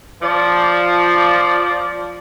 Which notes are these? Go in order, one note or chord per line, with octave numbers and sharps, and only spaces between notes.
F3 D5